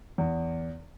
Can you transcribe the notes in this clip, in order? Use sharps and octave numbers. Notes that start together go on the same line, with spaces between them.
E2